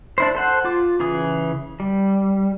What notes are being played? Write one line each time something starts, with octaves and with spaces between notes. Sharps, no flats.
D4 E4 C5
A4 C5 F#5
F4 D6
C#3 E3 G#4 D#6
G3